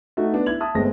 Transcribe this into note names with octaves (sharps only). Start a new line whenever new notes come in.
A3 D#4 F#4
B3 D4
E4 G#6 F#7
E5 A5 D#6
G1 G#3 A3 C4 A#6